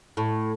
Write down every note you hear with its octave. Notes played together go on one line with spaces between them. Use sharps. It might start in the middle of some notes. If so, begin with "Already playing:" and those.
A2